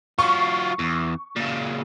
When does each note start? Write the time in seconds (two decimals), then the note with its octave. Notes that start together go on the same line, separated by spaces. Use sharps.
0.19 F#3 F4 C#6
0.79 E2
1.36 A#2 C#3